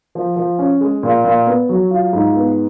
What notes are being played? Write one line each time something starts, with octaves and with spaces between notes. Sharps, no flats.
F3
F3
C#4
G#3
A#2
A#2
B3
F#3
F4
G#2
B3